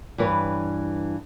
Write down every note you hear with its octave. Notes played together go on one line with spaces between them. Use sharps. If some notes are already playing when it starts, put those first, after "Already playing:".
G2 E3 B4 C#5